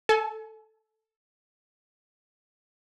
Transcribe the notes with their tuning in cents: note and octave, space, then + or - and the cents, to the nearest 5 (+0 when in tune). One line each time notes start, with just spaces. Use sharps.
A4 +0 G#5 +40